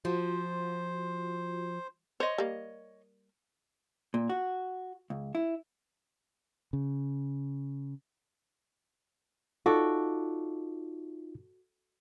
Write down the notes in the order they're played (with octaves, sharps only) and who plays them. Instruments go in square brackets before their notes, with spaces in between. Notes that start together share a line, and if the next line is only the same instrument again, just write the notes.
[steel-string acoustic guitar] F3 [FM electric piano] F4 F#4 [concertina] C5
[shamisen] C5 [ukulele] C#5 D#5
[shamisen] G3 A#3
[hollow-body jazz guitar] A#2
F#4
C#2
E4
[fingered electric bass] C#3
[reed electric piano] D#4 F4 [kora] F#4 A4 D5